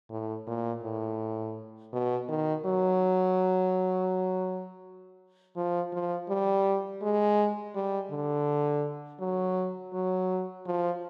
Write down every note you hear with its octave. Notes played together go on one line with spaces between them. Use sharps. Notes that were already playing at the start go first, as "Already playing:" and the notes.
A2
A#2
A2
B2
D#3
F#3
F3
F3
G3
G#3
G3
D3
F#3
F#3
F3